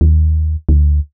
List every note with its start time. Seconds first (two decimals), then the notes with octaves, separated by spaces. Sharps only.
0.01 D#2
0.69 D2